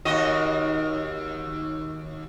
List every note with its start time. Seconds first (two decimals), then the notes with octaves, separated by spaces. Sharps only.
0.05 D#2 F#4 D#5